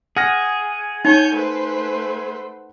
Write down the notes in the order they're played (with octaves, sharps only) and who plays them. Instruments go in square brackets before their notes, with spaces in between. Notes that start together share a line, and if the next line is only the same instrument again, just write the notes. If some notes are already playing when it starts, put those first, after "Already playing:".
[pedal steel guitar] G#4 [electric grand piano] F#5 F6 A#6
[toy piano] D#4 [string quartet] C#5 G#5 G6
[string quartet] A3 B4 C5